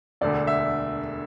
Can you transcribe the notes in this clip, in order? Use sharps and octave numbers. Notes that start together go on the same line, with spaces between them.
E1 D2 D3 D5
E5